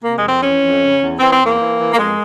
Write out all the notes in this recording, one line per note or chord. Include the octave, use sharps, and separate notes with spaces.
C3 A#3
G#3
F2
C4
E3 C#4
F2
C#3
E2
E3 C4
C4
E2
A#3
E3
E3
A#3
F2 G#3